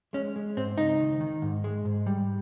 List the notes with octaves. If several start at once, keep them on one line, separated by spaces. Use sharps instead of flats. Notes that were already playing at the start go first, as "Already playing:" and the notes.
G#3 C#4
G#3
G#2 C4
C#2 D#4
D#3
D#3
G#2
G#3
G#2
G3